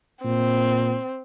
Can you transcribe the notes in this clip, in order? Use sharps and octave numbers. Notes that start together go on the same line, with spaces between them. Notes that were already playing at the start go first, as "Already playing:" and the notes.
A#2 C4